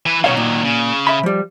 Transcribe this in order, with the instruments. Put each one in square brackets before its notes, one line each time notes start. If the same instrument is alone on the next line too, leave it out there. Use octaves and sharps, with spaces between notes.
[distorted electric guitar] E3 B4
[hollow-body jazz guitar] B2 C#5 F5 [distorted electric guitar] D#3 F#3
[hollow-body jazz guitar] A#2
[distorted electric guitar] C#3
[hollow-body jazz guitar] E5 B5
F3 G3